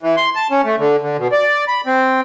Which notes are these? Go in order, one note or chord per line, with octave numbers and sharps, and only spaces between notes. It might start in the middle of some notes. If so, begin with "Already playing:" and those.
E3
C6
A5
C#4
A3
D3
D3
B2
D5
B5
C4